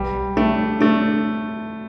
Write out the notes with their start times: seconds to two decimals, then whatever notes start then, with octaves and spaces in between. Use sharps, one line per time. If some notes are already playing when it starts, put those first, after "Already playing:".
Already playing: B1 G3
0.37 A3 D4
0.81 A3 D4